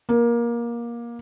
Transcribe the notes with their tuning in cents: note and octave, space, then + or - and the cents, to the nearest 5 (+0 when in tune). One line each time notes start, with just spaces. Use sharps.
A#3 +20